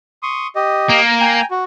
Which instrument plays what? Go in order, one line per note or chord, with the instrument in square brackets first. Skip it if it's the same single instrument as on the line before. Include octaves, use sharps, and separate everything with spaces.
[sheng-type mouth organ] C6 C#6 D#6
G4 D#5
[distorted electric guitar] A#3
[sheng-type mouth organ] G5 G#5 A#5
F#4